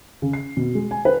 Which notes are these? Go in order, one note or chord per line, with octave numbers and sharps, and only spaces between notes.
C#3
C7
B2
G#3
G#5
B4